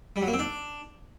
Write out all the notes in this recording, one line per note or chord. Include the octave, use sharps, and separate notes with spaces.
G3
F#3
A#3
C4
D4